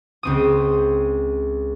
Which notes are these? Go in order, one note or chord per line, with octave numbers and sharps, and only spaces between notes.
C#2 C4 D#6